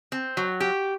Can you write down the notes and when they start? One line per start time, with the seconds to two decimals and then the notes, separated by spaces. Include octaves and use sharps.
0.12 C4
0.37 F#3
0.60 G4